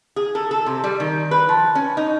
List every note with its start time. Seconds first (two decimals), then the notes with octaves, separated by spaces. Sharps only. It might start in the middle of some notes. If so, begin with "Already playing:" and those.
0.16 G#4
0.35 A4
0.51 A4
0.66 C3
0.84 G3
1.00 D#3
1.31 B4
1.49 F3
1.75 C#4
1.97 D#4